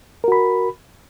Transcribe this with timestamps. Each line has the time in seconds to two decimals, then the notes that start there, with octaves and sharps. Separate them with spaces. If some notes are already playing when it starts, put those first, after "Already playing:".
0.24 A#4
0.28 F#4
0.32 B5